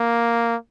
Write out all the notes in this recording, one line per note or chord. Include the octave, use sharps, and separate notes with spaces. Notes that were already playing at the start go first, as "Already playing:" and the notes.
Already playing: A#3